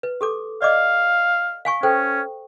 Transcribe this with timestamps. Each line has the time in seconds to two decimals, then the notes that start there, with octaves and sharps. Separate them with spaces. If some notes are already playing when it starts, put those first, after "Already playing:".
0.03 B4
0.21 G4 A4 D6
0.62 D5 D#5 F5 D6
1.65 F5 G#5 C#6
1.83 C#4 A4 C5 G5